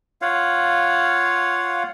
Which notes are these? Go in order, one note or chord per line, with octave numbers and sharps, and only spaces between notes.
F4 C#5 F5 F#5